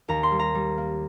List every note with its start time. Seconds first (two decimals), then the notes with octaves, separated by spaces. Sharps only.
0.08 D#2 A#5
0.23 C6
0.31 G3
0.39 A#5
0.55 G3
0.78 A#3